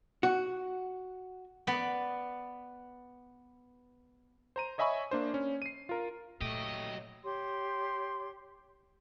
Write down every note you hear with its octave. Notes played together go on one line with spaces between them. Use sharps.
F#4
B3 D5 B5
C5 A#5 D#7
C#5 D#5 E5 G#5 B5 C#6
A#3 D4 C5
C#4
C7 D#7
F4 A#4
A#2 F#3 A3 G4 D#5
G4 C#5 C6